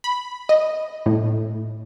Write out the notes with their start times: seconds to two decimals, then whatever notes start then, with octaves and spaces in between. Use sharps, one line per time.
0.04 B5
0.49 D#5
1.06 A2